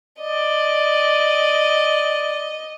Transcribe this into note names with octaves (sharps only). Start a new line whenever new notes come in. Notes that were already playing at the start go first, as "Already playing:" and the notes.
D5 D#5